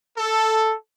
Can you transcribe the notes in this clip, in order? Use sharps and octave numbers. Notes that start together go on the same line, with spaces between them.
A4